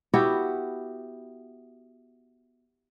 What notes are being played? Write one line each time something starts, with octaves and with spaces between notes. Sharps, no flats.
B3 E4 F#4 G4